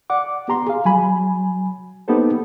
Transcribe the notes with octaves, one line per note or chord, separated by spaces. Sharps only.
D5 F#5 D6
B3 G4 A#5 C6
G#4 F5
F#3 G#5 B5
A#3 B3 D#4 G4 A4 C5